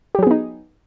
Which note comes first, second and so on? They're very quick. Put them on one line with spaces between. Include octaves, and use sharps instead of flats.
G4 F#3 G#4 B3 D#4